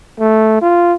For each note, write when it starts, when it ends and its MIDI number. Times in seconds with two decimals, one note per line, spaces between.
0.20 0.58 57
0.62 0.94 65